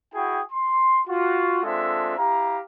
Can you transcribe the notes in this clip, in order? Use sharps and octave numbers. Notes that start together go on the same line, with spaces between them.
E4 F#4 G#4 G5
C6
F4 F#4
G#3 C4 D4 F4 A4 E5
E4 G4 F5 A#5